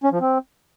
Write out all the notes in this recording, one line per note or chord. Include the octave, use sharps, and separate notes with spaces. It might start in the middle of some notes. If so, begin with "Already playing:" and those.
C#4
F3
C4